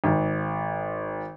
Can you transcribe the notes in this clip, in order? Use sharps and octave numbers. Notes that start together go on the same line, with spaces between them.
G#1